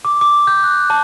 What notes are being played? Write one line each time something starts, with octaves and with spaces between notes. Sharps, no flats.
D6
D6
G6
F#6
A5